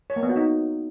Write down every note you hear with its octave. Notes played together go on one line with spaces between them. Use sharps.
C#5
A#3
B3
F#4
D#4